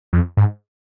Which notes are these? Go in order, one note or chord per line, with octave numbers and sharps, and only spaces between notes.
F2
G#2